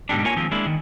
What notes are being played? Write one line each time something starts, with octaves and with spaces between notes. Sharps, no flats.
G#2 B2 D3 G3 D4
A#3 F4 A#4 C#5 G#5
D#3 F3 G#3 A#3 C4
G#3 A#3 D4 E4 G#4
D#3